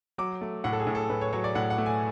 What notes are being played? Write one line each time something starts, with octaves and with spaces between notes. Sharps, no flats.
F#3 D6
A3
A2 F#5
A4
G#4
A2
A4
A2 B4
C#5
F#3 C#5
D5
A2 F#5
F#5
A3
G#5